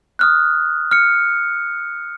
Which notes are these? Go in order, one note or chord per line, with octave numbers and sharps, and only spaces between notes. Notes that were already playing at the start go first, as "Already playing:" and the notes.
D#6 F6 F#6
F6 C#7